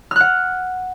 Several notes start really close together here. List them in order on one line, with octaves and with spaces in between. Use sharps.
F6 F#6 F#5